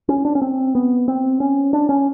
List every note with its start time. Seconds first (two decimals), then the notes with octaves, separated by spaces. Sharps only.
0.09 C#4
0.25 D4
0.35 C#4
0.42 C4
0.75 B3
1.08 C4
1.40 C#4
1.73 D4
1.89 C#4